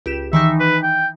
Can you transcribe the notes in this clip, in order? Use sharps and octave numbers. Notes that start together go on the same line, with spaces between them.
C#2 G4 E7
D#3 E3 D#4 E5
B4
G5